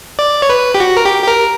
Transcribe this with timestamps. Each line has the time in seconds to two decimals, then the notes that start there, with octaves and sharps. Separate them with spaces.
0.19 D5
0.42 C#5
0.50 B4
0.74 G4
0.80 F#4
0.97 A#4
1.05 G4
1.23 G4
1.28 A#4